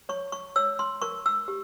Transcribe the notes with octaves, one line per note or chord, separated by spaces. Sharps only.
C#5 C#6
C#6
C#5 E6
C6
A#4 C#6
E6
G4